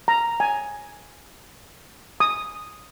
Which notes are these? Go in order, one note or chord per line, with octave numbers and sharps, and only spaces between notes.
A#5
G#5
D#6